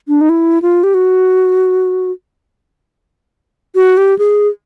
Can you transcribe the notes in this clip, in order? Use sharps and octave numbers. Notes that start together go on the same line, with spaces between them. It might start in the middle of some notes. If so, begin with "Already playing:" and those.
D4
D#4
E4
F4
G4
F#4
F#4
G4
G#4